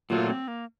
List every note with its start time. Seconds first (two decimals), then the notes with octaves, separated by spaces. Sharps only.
0.10 A#2 F#3 A3 F4
0.29 C4
0.48 A#3